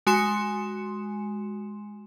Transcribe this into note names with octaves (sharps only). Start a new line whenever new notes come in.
G#3 F#4 G#5 C6 C#7 E7